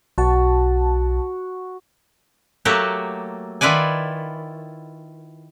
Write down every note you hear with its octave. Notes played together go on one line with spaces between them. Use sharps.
B1 F#4 A5
F#3 A3 A#3 F#4 G4
D#3 E4 F4 B4 D5 G#5